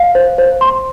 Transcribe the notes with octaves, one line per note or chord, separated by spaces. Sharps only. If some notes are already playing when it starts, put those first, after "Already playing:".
Already playing: F5
C5
C5
C6